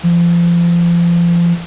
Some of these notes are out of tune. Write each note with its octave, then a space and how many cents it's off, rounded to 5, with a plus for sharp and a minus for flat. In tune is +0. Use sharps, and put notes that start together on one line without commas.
F3 -30